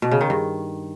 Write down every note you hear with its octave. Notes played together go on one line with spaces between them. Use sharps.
B2
C#3
D#3
G2